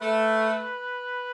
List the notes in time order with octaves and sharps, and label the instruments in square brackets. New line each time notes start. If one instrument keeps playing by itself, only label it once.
[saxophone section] A3 [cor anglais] B4